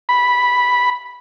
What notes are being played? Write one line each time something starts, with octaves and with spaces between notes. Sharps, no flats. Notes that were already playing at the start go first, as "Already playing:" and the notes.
B5